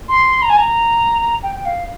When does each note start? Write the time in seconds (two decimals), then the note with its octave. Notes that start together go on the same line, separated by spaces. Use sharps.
0.08 C6
0.42 A#5
0.49 G#5
0.57 A#5
1.43 G5
1.55 G5
1.65 F5